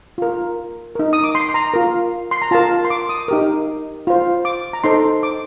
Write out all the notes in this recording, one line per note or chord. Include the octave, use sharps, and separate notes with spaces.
F4 A#4
D#4 A#4
D#6
D6
C6
C6
A#5
F4 A#4
C6
A#5
F4 A#4 A5
C6
D6
D#6
D#4 G4 A#4
F4 C5
D6
A#5
D#4 A4 C5 C6
D6